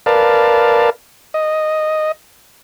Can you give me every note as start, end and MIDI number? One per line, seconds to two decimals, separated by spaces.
0.06 0.90 70
0.06 0.90 71
0.06 0.90 74
0.06 0.90 77
0.06 0.90 81
1.34 2.12 75